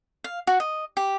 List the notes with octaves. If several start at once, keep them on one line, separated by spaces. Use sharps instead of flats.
F5
F#4
D#5
G4